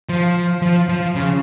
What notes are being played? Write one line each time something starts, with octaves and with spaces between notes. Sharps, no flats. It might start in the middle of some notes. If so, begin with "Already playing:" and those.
F3
F3
F3
C#3